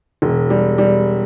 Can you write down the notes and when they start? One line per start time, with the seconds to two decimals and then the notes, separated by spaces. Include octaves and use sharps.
0.22 E1
0.50 G3
0.78 G3